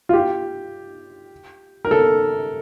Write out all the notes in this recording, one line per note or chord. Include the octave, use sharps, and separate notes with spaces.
F4
G4
A#4
A4